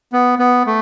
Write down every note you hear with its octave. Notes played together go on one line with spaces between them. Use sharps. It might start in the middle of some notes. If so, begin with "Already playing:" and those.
B3
B3
A3